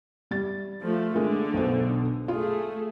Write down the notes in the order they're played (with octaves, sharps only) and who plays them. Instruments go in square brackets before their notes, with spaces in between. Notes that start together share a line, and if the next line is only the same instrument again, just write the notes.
[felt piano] G3 A6
[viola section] F3 A3
[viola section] D3 [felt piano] G#3 A#3
[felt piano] B1 B2 C5
[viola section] A3 G#4 [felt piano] F4